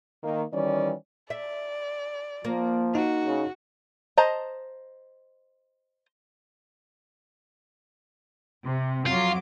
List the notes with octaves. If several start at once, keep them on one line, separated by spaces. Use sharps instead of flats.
D#3 A#3
D#3 E3 G3 C#4 C#5 D5
D5 E5
F3 A#3
D#4 F#4
C#3
C5 D#5 A5 A#5
C3
F2 F#3 F4 D6